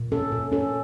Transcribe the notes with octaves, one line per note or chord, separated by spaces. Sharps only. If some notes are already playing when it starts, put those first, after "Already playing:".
Already playing: A#2
C#4 A4
A#2
C#4 A4